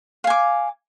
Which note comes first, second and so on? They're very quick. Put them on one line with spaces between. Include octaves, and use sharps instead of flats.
F5 G#5 D6